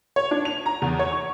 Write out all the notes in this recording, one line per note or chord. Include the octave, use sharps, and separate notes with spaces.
C#5
D4
F7
A#5
E2
C#5
C#6